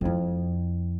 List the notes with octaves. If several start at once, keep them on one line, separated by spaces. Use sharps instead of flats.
F2 E4